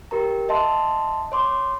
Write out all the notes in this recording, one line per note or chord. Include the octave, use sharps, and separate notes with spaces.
G4 A#4 A#5
D#5 E5 A5 C6
C#5 C6 D6